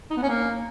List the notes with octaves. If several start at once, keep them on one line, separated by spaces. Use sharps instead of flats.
D#4
B3
C#4
A#3